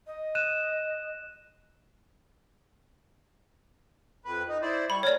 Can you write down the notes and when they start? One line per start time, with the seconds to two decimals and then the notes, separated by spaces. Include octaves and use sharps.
0.07 D#5
0.35 F#6 D#7 E7
4.25 F2 B4
4.49 D#4
4.62 E4 C5 D5
4.90 G3 B5 C#6
5.03 A2 A#4 C#5 D5